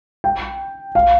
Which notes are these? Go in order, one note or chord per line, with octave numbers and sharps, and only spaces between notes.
G5
F5